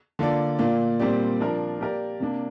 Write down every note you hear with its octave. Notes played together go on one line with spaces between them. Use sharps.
D3 A#3 F4 D5
A#2 A#3 F4 D5
A#2 G3 C4 G4 D5
F3 D4 A#4 D5
A#3 G4 A#4 D5
C3 A#3 D4